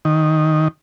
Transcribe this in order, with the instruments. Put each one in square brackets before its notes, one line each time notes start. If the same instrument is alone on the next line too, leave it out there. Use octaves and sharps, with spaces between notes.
[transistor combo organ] D#3